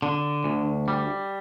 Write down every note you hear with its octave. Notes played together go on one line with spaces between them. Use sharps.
D3
D2
G3